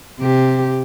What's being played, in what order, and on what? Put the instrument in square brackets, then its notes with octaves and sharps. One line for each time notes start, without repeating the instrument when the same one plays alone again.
[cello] C3 G4